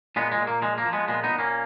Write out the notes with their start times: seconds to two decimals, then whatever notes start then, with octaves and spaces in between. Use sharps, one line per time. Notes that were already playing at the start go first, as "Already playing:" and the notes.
0.16 A#2 G#3 B3
0.32 G#3
0.39 A#2
0.47 A#3
0.62 F3 G#3
0.78 A#3
0.86 F3
0.93 G#3 B3
1.08 A#2 G#3 B3
1.23 B3 D#4
1.31 A#2
1.38 A#3 C#4